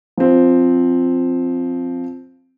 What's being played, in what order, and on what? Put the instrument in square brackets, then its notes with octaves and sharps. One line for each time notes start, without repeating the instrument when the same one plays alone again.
[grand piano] F3 C4